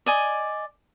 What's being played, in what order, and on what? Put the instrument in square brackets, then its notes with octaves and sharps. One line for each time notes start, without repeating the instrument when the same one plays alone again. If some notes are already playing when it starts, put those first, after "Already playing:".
[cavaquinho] D5 D#5 G#5